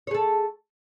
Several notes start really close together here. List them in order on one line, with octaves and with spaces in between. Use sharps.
C#5 G#4 A4